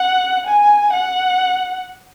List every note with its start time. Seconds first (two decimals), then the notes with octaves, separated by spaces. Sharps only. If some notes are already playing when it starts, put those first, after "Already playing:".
Already playing: F#5
0.47 G#5
0.93 F#5